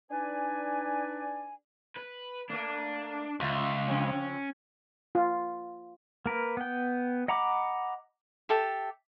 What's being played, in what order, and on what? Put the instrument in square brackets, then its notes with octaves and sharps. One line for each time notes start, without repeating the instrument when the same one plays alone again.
[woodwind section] D4 D#4 B4 D5 G#5
[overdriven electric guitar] B4
[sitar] A3 A#3 [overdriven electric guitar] D4
[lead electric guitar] C#2 [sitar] F4 E5
[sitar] C#3 F3 C4 [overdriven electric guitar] C#4
[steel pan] F4
[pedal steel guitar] A#3 A#4 B4
B3 G5
D#5 F#5 A#5 B5 D6
[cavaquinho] G4 A4 E5